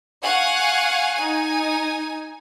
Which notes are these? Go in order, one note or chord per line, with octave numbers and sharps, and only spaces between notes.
F5 F#5 G#5 C#6 F#6
D#4 G#5